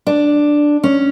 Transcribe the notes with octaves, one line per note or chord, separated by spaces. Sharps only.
D4
C#4